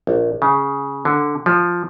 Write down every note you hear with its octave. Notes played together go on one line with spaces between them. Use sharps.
A#1
C#3
D3
F3